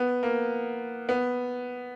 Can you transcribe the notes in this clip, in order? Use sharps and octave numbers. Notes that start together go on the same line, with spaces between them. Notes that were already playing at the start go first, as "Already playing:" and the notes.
Already playing: B3
A#3
B3